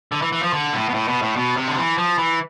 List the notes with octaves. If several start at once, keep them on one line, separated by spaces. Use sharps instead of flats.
D3
E3
E3
F3
D3
A2
B2
A2
B2
A2
B2
C3
D3
E3
F3
E3